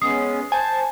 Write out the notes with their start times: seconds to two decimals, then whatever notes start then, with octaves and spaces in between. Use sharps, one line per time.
0.02 G#3 B3 C#4 D#6 C7
0.52 C5 G#5 A5